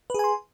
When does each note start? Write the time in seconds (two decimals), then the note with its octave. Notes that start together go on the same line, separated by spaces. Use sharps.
0.10 B4
0.14 G#4
0.19 G#5
0.24 C6